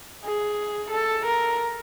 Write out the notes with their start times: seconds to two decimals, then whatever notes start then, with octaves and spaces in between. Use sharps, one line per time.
0.24 G#4
0.91 A4
1.26 A#4